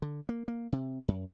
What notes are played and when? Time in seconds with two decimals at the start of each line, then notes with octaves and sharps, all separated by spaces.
0.02 D3
0.29 A#3
0.48 A#3
0.72 C3
1.08 F#2